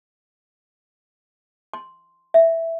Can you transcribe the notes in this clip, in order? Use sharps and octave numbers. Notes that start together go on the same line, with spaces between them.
C6
E5